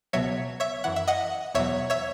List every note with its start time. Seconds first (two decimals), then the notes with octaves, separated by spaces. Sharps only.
0.13 C#2 B2 F#3 C#5 E5
0.60 C#5 E5
0.84 F#2 E3 F#5
0.96 E5
1.07 D#5 F#5
1.54 E2 B2 F#3 C#5 E5
1.90 C#5 E5